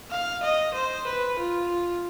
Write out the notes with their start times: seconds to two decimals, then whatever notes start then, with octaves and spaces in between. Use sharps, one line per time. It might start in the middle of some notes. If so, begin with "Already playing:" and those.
0.10 F5
0.43 D#5
0.74 C5
1.07 B4
1.39 F4